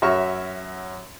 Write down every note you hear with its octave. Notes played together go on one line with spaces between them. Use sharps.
F#2 C#4 F#4 E5 C#6 F6